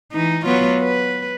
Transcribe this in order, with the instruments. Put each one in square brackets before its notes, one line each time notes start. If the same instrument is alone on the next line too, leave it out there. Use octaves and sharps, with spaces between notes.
[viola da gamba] E3 D#4
F#3 B3 F4
B4